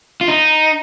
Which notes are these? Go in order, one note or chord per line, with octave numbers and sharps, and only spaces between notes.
F4
D#4